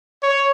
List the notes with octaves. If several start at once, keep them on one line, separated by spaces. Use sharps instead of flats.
C#5